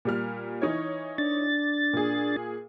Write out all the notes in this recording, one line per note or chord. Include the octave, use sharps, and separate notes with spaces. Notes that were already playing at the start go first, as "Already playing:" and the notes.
A#2 G3 F6
E3 D#4 C#5
D4 A6
A#2 G#4